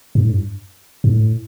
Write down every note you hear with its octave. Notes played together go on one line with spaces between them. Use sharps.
G2
A2
G2
G2
A2